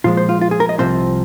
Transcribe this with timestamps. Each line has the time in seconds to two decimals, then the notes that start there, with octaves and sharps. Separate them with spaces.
0.04 A#2 F3 G#3 F4
0.17 C5
0.29 F4
0.41 F4
0.51 G#4
0.60 A#4
0.69 D#5
0.79 C2 C3 F3 C4 C5